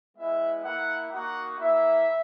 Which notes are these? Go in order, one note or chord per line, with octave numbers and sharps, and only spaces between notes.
G#3 B3 E4 E5
A#3 E4 F#5
A#3 D#4 F#4 F#5
A#3 E4 E5